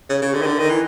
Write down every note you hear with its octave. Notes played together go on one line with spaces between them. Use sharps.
C#3
C#3
D3
D#3
D3
D#3
E3